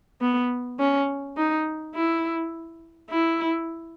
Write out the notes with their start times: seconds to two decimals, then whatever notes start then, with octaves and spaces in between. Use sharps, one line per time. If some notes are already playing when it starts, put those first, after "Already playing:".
0.21 B3
0.79 C#4
1.37 D#4
1.94 E4
3.10 E4